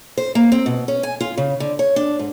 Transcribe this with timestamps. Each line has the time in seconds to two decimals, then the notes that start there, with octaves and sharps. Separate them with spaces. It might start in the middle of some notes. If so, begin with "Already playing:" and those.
0.18 C5
0.35 A#3
0.52 C4
0.66 B2
0.88 C#4
1.03 G#5
1.21 F4
1.38 C#3
1.60 D3
1.79 C#5
1.96 D4
2.19 G#2